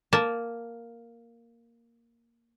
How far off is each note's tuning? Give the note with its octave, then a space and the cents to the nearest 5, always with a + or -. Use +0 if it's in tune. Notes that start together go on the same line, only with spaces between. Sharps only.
A#3 +0 A5 +0